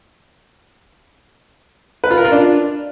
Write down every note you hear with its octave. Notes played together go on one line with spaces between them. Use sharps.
B4
F4
A#4
F4
D4